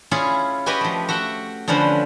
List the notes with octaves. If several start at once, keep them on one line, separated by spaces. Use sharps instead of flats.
C#4 E4 F4 G#4 C#5 B5
F#4 G4 B4 D#5 G5 G#5
F3 A3
F#4 E5 F#5 G5
D3 F3 C#4 B4 C5